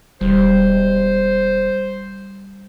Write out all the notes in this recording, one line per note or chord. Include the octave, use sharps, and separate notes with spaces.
E1 G3 C5